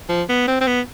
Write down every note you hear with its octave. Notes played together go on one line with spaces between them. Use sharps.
F3
B3
C4
C4
B3